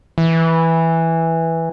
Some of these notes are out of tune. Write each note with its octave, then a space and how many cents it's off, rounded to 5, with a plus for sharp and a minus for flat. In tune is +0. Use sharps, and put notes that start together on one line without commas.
E3 -5